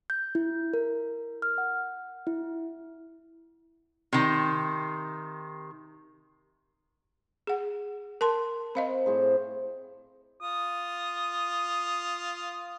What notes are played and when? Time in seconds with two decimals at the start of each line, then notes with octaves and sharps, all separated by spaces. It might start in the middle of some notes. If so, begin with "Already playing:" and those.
0.10 G6
0.35 E4
0.74 A#4
1.42 F6
1.58 F#5
2.27 E4
4.13 C3 D#3
7.47 G#4 F#5
8.21 A#4 A5 C6
8.75 C4 D#5 F5 B5
9.06 A2 G#4 C5
10.41 F4 D#6